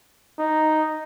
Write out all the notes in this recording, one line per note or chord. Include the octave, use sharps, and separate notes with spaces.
D#4